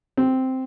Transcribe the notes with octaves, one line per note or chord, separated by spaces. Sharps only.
C4